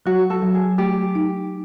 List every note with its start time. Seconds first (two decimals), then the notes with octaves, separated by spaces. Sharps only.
0.06 F#3 F#4
0.30 A4
0.43 F#3
0.54 G#4
0.78 A3 G4
1.15 D#4